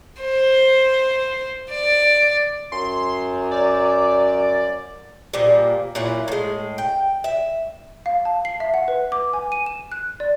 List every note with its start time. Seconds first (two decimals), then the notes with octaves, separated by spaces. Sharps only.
0.22 C5
1.72 D5
2.72 F#2 C6
3.51 D5
5.34 A#2 F3 G3 A#3
5.95 A#2 F#3 E4 F4
6.28 A2 G#3
6.78 G5
7.24 E5
8.06 F5
8.25 A5
8.45 C7
8.60 E5
8.74 F#5
8.88 B4
9.12 D6
9.33 G#5
9.52 D#7
9.66 E7
9.92 F#6
10.20 D5